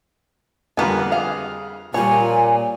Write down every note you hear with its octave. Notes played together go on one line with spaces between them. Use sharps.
F2 D3 G3 A#3 B3 G#5
G#4 F5
A#2 F3 G3 C#5 G#5